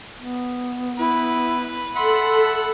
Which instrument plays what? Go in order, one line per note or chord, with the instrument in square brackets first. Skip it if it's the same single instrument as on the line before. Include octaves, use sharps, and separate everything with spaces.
[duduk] B3
[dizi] E4 [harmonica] B4
[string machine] A4 [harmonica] E5 F#5 B5 [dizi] C6